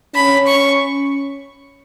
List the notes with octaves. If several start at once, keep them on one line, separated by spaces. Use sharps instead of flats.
C#4 B5
C#6